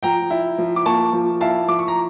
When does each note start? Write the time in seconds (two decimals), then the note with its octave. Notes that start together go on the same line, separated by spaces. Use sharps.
0.03 F3 G5 A#5
0.30 E4
0.58 F3
0.76 D6
0.86 A#3 A5 C#6
1.13 F3
1.41 E4 F5 A5
1.68 F3 D6
1.79 C#6
1.88 A#5